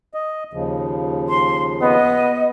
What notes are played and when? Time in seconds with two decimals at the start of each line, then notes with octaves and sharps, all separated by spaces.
0.14 D#5
0.54 D#2 C#3 F3
1.29 C6
1.82 B3 D#5